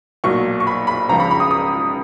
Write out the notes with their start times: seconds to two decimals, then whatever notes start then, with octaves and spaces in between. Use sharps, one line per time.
0.24 B1 A#2 F#3 C#6
0.60 C#6
0.67 B5
0.87 B5
1.09 C#2 C#3 F3 A#5
1.20 B5
1.31 B5
1.40 D#6
1.51 D#6